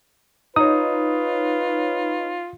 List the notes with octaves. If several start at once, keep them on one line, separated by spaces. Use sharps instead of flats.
D#4 F4 B4 C#5 D#6